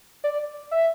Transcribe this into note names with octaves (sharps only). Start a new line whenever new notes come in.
D5
E5